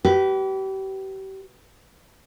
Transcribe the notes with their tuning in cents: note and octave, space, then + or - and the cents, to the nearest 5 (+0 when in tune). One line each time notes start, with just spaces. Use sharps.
G4 -35 B4 +0